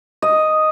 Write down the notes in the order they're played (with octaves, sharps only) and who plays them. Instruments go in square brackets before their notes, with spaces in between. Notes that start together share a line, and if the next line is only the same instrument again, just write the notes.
[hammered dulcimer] D#5